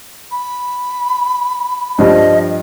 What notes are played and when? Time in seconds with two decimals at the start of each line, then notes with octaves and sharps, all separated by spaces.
0.31 B5
1.99 G2 F3 G3 D#5